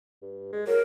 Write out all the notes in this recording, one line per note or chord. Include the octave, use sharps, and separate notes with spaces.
G2
G#3
F#3 A#4